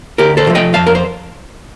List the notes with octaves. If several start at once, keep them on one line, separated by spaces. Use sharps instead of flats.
D2 G4 A#4
A4 C5
C3 F3 A3
D#5 G5
F2 F5 A5
A#4
C5